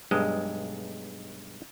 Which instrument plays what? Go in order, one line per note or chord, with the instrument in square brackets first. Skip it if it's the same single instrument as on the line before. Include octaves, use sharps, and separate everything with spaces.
[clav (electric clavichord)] B1 G2 G#3 D#5